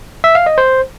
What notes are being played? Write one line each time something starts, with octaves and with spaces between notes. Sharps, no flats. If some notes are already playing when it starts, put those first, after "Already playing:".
E5
F5
D#5
C5